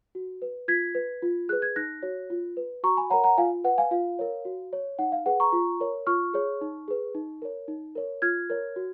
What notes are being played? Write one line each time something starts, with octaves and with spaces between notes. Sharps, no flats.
F#4
B4
F4 G#6 B6
B4
F4
G#4 B4 F#6
G#6
D#4 F#6 A#6
F#4 C#5
F4
B4
F#4 A#5 C#6
G#5 B5
A#4 C#5 F#5 A#5
F#5 A#5
F4 F5 G#5
B4 F#5
F5 G#5
F4 F5
A#4 C#5
F#4
C#5
D#4 F#5
F5
G#4 B4 F#5
A#5 C#6
F4
A#4 C#5
F4 C#6 F6
G#4 C#5
D#4
G#4 B4
D#4
A#4 C#5
D#4
A#4 C#5
F4 F6 G#6
A#4 C#5
F#4